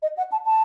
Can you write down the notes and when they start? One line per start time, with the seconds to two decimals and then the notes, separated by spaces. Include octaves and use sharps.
0.02 D#5
0.17 F#5
0.31 A5
0.45 A5